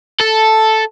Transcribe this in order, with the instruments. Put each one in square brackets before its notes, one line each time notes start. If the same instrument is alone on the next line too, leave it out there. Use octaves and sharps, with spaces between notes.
[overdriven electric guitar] A4